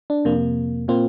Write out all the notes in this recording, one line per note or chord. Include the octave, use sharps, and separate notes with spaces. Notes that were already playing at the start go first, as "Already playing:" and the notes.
D4
F2 C3 A#3
A#2 A#3 C4 F4